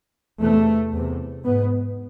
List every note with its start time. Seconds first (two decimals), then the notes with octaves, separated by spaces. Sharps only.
0.41 E2 C3 A3
0.93 E2 C3
1.44 G#2 B3